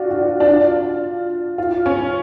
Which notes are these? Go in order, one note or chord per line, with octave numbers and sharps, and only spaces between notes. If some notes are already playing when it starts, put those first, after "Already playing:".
Already playing: D4 F4 F#4
F#4
D4
F4
F4
C#4